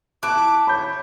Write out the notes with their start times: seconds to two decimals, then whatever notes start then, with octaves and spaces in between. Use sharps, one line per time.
0.23 E4 A5 D6 F#6 D7
0.67 C#5 B5 G6